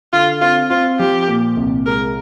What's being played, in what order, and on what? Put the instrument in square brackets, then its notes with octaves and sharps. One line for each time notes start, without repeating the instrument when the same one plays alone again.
[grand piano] D3 [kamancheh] F4
[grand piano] C4 [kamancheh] F4
[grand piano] C4 [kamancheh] F4
[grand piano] F3 [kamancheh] G4
[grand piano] A#2
C2
[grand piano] G#3 [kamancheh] A#4